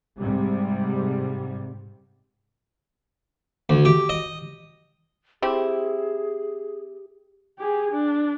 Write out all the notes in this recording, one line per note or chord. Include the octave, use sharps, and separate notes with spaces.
G#2 C3 G3
D2
G4
D#5
C4 E4 G4 G#4
G4 G#4
D4